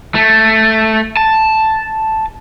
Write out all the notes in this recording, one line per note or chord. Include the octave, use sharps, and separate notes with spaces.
A3
A5